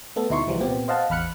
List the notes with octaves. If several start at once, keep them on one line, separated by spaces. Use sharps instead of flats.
A3 B3 A4
D2 B2 D#4 E4 C6 C#6
C2 E3 F3 G3
A#2 B3 C4 G4
C5 D#5 F5 F#5 A5
A1 E2 B5 F6 F#6 C#7